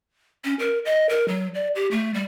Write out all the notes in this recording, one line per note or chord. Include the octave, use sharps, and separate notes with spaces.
C#4
A#4
D#5
A#4
F#3
D5
G4
A3
G3